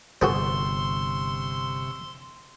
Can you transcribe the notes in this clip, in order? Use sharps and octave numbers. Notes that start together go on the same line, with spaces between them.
G1 C3 F#4 G#4 C5 C6 C#6 E6